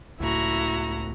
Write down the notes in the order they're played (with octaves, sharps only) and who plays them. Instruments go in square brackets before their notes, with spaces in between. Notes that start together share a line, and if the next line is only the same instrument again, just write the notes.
[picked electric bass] C#2 A2 [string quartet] E4 F#4 A#5